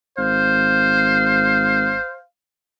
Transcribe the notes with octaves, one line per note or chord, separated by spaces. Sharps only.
G#1 C5 F5